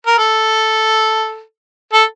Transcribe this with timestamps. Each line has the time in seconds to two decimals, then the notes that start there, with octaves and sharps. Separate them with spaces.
0.06 A#4
0.18 A4
1.93 A4